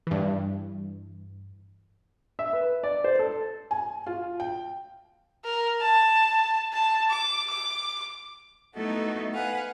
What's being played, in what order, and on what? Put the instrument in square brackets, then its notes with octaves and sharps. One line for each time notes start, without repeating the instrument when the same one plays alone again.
[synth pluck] G2 E3
[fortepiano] E5
B4
D5
C5
A4
[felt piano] G#5
F4
G5
[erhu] A#4
A5
A5
D6
D6
[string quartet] A3 B3 D#4 E4 F#4 A4
B4 F5 F#5 G#5